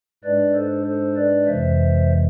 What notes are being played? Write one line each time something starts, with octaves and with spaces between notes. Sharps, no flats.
G#2 G#3 D4 B4 D5
A4 C5
A4 C5
B4 D5
F2 C3 E3 G#3 C5 E5